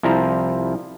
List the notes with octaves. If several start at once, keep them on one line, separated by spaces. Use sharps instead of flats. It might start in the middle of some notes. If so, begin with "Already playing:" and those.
C2 F3 E4 C5 A#5